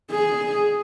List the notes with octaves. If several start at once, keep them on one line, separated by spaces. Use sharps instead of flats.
G#4